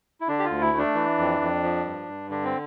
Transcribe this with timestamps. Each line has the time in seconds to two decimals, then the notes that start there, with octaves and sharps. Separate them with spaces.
0.21 E4
0.28 D3 D4
0.39 G4
0.44 F4
0.51 D2
0.61 E4
0.73 A3
0.78 D4
0.95 E3
1.18 F2
1.40 F2
1.63 F3
1.85 G2
2.08 G2
2.30 D3 D4
2.44 C4